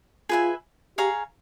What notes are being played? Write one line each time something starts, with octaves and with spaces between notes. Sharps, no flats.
F4 G#4 B4 E5 G#5
G4 G#4 C#5 F5 A#5